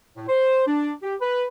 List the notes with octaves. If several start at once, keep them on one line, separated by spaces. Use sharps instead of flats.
A2
C5
D4
G4
B4